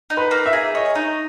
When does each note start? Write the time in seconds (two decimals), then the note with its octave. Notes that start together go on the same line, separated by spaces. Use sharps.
0.10 D#4
0.17 B4
0.31 A#3
0.46 E5
0.53 G#4
0.74 C#5 D#5
0.95 D#4